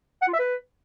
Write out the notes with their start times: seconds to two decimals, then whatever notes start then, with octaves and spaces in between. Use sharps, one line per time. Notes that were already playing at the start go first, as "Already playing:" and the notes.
0.22 F#5
0.27 F4
0.33 E5
0.39 B4